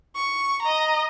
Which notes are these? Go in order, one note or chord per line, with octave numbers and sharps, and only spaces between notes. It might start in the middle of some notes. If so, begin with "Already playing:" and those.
C#6
D#5 A#5